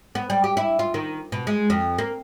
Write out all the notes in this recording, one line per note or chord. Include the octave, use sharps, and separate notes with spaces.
B3
G3
G4
E4
F4
D#3
B2
G#3
F2
A#3